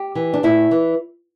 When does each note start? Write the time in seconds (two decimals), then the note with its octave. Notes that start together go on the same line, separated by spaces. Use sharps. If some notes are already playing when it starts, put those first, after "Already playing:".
Already playing: G4
0.15 E3
0.33 D4
0.43 A2 E4
0.71 E3